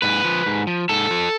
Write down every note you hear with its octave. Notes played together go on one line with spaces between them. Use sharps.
G#2 B4
F3
G#2
F3
G#2 A4
F3